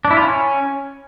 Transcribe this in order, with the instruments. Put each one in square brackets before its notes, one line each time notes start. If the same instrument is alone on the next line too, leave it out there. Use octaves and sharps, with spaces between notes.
[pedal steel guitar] D4
E4
F4
C#4